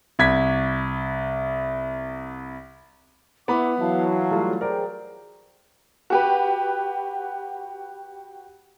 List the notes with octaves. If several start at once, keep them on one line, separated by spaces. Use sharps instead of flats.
C2 G#6 B6
B3 E4 F#5 B5 D6
E3 F#3 E4 F5 A5
G3 A3 F4
G#4 A#4 C5 D5 G5
F#4 G4 B4